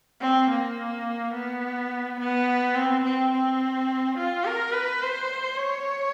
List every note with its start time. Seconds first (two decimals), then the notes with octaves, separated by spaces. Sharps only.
0.21 C4
0.50 A#3
1.34 B3
2.20 B3
2.75 C4
3.04 C4
3.32 C4
4.17 F4
4.45 A#4
4.72 B4
5.02 C5
5.58 C#5